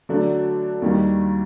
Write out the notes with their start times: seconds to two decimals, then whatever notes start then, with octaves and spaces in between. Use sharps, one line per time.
0.09 D3 F#3 A3 D4 F#4
0.82 D#2 D#3 G3